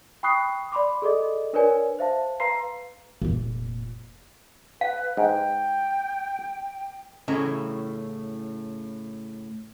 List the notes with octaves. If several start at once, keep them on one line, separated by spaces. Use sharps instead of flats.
G5 B5 C#6 D#6 F#6 C7
D5 B5 C6 D6
G#4 A4 D5 D#5
D4 A#4 B4 C#5 D5 G#5
C5 E5 F5 A5
B4 F5 A#5 C6 C7
F1 A#2
B4 F5
G#2 G5
A2 C#3 C#4 E4 A#5